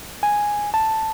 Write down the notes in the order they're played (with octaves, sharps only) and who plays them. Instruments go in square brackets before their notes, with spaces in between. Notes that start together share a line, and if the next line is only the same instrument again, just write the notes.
[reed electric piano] G#5
A5